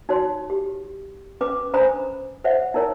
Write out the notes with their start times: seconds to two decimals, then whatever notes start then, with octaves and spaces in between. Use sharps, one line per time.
0.09 D#4 F#4 C#5 C6
0.50 G4
1.41 C#4 B4 D6
1.73 C#4 D4 C5 A#5 B5 D#6
2.44 C5 C#5 E5 F#5
2.74 D#4 E4 A#4 C#5